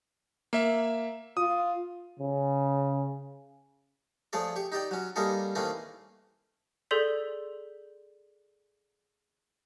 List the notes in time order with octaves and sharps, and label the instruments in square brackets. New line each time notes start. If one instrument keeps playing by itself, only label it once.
[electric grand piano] A#3 E5
[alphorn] F4 [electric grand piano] D#6
[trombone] C#3
[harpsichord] F3 A3 G#4 C#5 D5
G4 C#6
D#4 G4 D5 G5
F#3 C#4
G3 A#3 C#4 D#4 G#4 A4
D#3 E3 A3 A#3 C4 C#4
[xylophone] G#4 A4 D5 C6 G6 B6